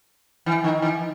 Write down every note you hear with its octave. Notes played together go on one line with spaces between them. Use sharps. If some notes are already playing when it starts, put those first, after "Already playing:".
E3
D#3
E3